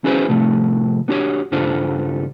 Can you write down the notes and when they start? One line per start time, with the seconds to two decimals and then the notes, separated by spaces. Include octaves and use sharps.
0.04 C#4 E4 F#4 G#4 B4 C5
0.28 A2 C3 F3 A3
1.08 B3 D4 F#4 G4 C#5
1.52 C#2 G2 D4 F4 A4 C5